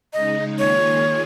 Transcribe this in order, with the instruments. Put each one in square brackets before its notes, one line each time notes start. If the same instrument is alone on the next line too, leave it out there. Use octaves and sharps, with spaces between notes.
[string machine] C#3 G#3 D#4 [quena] D#5
[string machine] D#3 A#3 F4 G#4 [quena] C#5